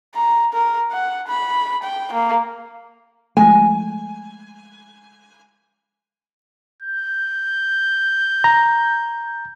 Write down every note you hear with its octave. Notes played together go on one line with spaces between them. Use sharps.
A#5
A#4
F#5
B5
G5
A#3
F3 G#3 A3 G#5
G6
A#5